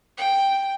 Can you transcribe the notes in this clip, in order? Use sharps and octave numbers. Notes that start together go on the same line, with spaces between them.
G5